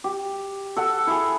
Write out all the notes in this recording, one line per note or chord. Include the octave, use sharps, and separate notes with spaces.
G4
A4 F#5
E4 G#4